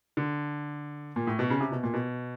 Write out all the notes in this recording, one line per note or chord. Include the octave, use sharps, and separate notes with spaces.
D3
A#2
A2
B2
C#3
C3
B2
A#2
B2